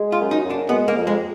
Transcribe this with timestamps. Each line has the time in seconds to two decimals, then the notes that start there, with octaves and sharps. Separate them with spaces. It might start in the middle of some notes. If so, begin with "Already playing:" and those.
Already playing: G#3
0.12 F4
0.19 F#2
0.31 D#4
0.44 F#2
0.50 D4
0.69 G#3 B3
0.88 A#3
0.94 F2
1.07 G#3